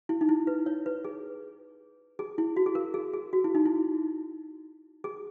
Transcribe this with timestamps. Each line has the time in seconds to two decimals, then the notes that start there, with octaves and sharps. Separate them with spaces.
0.09 E4
0.21 D#4
0.29 E4
0.47 B4
0.66 C#5
0.86 B4
1.05 G#4
2.19 G#4
2.38 E4
2.56 F#4
2.66 G#4
2.75 A#4
2.94 G#4
3.14 G#4
3.33 F#4
3.44 E4
3.55 D#4
3.65 E4
5.04 G#4